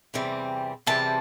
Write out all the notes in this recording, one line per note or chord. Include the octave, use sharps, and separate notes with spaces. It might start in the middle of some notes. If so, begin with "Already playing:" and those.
E2 C3 E3 G3 C4
E2 C3 E3 G3 C4 A5